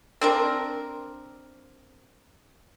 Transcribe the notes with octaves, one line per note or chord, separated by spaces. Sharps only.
C4 D4 A#4